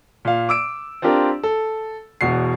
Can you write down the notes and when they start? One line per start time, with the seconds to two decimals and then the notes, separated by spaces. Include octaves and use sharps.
0.25 A#2 F5
0.49 D6 E6 D7
1.02 C4 D4 F4 G4 A#4
1.44 A4
2.21 E1 E2 B2 C7